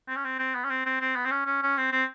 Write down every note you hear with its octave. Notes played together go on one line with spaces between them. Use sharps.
C4
C#4
C4
C4
B3
C#4
C4
C4
C4
B3
C4
C#4
C#4
C#4
C4
C4